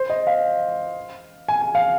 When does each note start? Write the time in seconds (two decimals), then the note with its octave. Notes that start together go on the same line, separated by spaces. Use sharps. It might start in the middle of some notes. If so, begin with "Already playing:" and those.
Already playing: C5
0.10 D#5
0.27 F5
1.48 G#5
1.62 G#5
1.75 F5